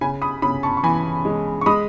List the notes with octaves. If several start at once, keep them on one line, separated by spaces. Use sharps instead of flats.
C#3 G#5 B5
B5 D#6
C#3 B5 D#6
A5 C#6
C#6
E3 G#5 B5
G#3
C#6
G#3 B5 D#6